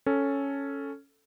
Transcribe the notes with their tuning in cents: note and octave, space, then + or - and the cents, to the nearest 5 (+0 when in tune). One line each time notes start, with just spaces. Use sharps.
C#4 +0 A4 +0